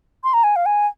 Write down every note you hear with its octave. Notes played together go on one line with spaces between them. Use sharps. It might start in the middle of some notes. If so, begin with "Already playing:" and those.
C6
A#5
G#5
F5
G#5